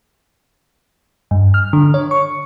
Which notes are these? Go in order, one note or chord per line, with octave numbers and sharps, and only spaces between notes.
G2
F6
D3
C#5
C#6